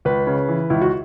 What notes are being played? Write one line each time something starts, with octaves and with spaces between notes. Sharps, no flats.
C#2 B4
C#3
E3
C#2 E4
F#4